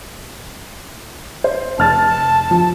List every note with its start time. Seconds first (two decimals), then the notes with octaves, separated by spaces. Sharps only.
1.44 C5
1.79 F1 A5 F6 A6
2.51 F3